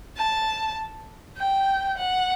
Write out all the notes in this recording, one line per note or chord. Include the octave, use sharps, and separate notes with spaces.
A5
G5
F#5